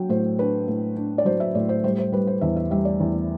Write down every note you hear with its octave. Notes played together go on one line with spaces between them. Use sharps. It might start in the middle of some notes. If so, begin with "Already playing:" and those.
Already playing: F#3 D4 G5
A2 C5
D4 B4
A2
D4
D5
F#3 C5
E5
A2 D5
C5
G3 C5
C5
G3 B4
C5
E2 E5
E5
G3 E5
D5
E2